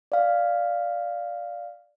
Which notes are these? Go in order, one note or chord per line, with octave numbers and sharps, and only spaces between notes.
D5 F5